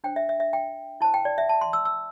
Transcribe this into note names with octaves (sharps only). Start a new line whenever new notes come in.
D4 C5 G5
E5
E5
E5
G5
E4 C5 A5
G5
D5
E5
A5
C6
E6
E6